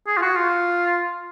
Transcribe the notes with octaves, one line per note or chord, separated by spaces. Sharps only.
G#4
F4
F#4
F4